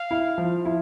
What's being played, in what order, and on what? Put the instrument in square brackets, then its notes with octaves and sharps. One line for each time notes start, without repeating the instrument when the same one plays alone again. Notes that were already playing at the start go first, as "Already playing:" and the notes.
Already playing: [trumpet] F5
[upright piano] E4
F3
E4